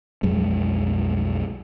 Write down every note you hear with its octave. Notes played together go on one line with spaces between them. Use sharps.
B1 F2 F#3 G#3